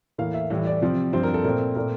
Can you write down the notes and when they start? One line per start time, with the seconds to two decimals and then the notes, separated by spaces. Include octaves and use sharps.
0.18 A2 E3 A#3 F5
0.34 E5
0.50 A2 E3 G3 E5
0.66 D5
0.81 C3 F3 C4
1.13 G2 F3 C4 C5
1.23 A#4
1.34 A4
1.44 A#2 A3 C4 A#4
1.75 A#2 A3 C4 A#4